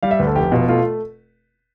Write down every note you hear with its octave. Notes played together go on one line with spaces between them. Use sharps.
G3 F5
E5
D2 B4
A4
F1 G4
B2 F4
A3 F4